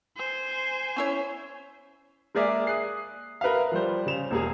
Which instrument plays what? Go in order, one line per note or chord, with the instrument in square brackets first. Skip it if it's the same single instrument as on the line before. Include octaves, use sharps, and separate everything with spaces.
[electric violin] C5 G#5
[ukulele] C#4 E4 C#5
[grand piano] G#3 A#3 G#4 A#4 D5 E5
D#6 F#6 C7
A#4 B4 E5 F5
F3 G3 C5
C#3 E7 F7
E1 A#3 G#4